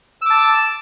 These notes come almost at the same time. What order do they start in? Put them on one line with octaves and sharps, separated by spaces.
E6 D6 A5